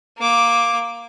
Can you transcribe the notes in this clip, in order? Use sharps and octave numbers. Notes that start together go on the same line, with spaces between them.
A#3 D6